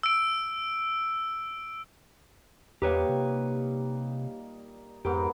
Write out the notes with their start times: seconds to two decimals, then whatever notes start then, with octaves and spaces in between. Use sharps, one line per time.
0.03 E6 D7
2.82 E2 A#2 G3 D#4 G4 B4 C#5
3.09 C3
5.05 F2 G#2 B3 G4 A#4